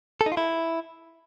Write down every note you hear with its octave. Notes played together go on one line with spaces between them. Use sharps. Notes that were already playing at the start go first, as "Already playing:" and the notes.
A4
D#4
F4
E4